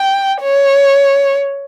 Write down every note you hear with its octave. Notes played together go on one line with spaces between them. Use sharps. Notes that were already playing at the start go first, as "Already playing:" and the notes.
Already playing: G5
C#5